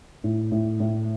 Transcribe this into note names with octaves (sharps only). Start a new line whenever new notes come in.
A2
A2
A2